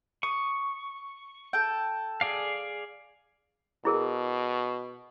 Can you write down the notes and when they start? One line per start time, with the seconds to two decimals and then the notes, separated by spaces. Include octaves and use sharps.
0.23 C#6 D#6
1.53 A4 G5
2.21 G#4 D5 F5
3.85 B2 E4 G#4 A#4